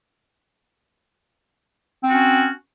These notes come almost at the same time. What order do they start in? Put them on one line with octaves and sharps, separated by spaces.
C4 F#4 C#4